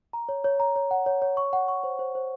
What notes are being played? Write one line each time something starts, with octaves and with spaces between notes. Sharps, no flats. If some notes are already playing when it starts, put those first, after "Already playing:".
A#5
C#5
C#5
A#5
C#5
F#5
C#5
C#5
C#6
F#5
C#6
C5
C5
C5